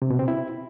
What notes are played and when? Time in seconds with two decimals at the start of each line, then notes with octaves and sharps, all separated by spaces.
0.02 C3
0.10 B2
0.19 C4
0.28 E4